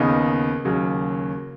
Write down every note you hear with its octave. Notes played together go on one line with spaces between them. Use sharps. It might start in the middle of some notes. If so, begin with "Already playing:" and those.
Already playing: D#2 C#3 B3 D#4
D#2 C#3 F#3